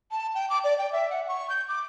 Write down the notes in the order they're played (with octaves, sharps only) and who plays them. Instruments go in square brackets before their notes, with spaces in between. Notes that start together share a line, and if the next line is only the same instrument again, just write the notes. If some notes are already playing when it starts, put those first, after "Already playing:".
[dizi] A5
G5
D6
D5
G5
E5
F#5
C#6
G6
D6